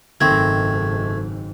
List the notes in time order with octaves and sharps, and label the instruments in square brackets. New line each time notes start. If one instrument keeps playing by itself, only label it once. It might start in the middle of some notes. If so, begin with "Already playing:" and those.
[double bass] F#1 G#2 [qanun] D#3 C4 [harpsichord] A3 [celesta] G#6